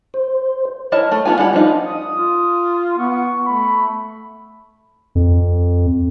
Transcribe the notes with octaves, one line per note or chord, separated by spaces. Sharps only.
C5
E4 A#4 C#5 D#5 A5
A3
A3 B3 E4 F4 G#5
G3 E4 F4 F#5 B5
F3 D4 D#4 F4
D#6
F4
B3 C#6
A3 B5
F2